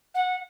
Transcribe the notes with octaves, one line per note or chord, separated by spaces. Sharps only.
F#5